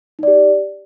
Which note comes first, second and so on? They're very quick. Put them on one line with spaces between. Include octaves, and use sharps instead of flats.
D#4 D5 G4